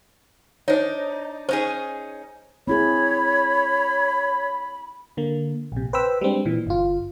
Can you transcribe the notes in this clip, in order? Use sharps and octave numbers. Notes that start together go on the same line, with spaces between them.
D4 D#4 C5 C#5
C#4 D#4 G#4 C5
C4 E4 G#4 C#5 B5
D3 A#3
A#1 C3
B4 C5 G5 B5 E6
G3 G#3 C4 D4
A#2 E3
G1 F4